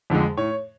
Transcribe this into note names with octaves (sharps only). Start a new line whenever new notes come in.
F2 D3 F3 G#3
A2 C#5